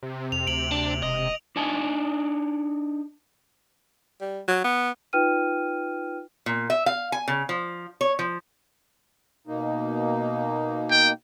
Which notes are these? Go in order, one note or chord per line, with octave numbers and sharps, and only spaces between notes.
C3
F2 F7
D2 D7 F#7
D4
E1 D#5
D4 D#4 G#5 A5
G3
F#3
B3
D#4 F4 B4 G5 F6 D#7
A#2
E5
F5
G#5
C#3
F3
C#5
F3
B2 A#3 D#4
G5